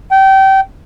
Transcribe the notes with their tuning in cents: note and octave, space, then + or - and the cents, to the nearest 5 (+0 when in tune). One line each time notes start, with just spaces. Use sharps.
G5 -25